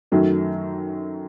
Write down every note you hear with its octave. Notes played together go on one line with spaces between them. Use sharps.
F#2 D#3 F#3 A3